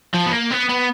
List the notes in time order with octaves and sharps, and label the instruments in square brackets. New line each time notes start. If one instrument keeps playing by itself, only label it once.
[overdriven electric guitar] F3
B3
A#3
B3
B3